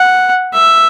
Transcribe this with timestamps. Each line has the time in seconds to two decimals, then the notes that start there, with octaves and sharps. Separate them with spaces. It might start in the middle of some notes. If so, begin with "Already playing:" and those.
Already playing: F#5
0.54 E5